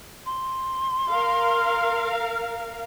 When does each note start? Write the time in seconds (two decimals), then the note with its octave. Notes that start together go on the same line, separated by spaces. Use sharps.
0.25 C6
1.09 A#4 F5